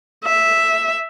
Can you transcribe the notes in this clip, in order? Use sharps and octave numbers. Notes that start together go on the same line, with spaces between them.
E5